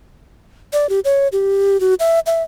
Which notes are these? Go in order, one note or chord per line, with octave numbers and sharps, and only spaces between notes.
D5
G4
C#5
G4
F#4
E5
E5